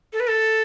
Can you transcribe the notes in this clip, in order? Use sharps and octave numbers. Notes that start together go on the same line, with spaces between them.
A4
B4
A4